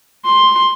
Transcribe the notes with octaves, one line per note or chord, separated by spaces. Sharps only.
C6